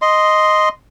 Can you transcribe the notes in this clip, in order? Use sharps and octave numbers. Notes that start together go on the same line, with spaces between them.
D#5 C6